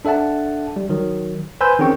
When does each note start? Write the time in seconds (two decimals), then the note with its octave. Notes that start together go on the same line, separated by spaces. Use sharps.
0.05 D4 A4 E5 F#5 A5
0.76 G3
0.89 D#3 F#3
1.61 B4 C5 G#5 B5 E6 G6
1.79 D#3 C4 C#4 G#4 G5 C#6